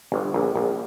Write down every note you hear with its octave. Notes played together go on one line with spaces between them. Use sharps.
G1
A#1
A#1